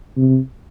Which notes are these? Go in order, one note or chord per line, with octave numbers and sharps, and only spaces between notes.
C3